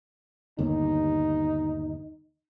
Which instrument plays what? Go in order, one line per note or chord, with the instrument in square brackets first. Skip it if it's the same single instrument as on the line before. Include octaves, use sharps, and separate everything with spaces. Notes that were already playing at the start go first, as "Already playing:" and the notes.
[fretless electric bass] G1 D#2 [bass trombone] D#4